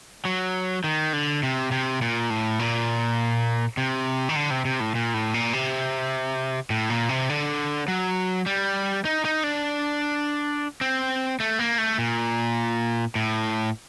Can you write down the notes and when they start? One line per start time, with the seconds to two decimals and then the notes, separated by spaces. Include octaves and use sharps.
0.25 F#3
0.84 D#3
1.13 D3
1.43 C3
1.72 C3
2.02 A#2
2.30 A2
2.59 A#2
3.77 C3
4.29 D#3
4.36 D3
4.50 C3
4.65 C3
4.80 A2
4.95 A#2
5.14 A2
5.34 A#2
5.53 C3
6.70 A2
6.90 A#2
7.09 C3
7.29 D3
7.88 F#3
8.46 G3
9.05 D#4
9.25 D#4
9.44 D4
10.81 C4
11.40 A3
11.59 A#3
11.78 A3
11.98 A#2
13.15 A2